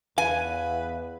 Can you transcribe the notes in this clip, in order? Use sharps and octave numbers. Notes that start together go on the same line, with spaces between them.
E2 B4 F5 G#5